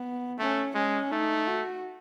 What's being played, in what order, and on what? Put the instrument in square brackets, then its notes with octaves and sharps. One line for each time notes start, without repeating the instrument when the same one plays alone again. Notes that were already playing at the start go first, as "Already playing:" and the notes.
Already playing: [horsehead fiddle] B3
[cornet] A3 [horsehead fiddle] C#4
[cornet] G#3 [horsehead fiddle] C#4
[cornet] A3 [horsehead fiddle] D#4
[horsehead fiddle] F#4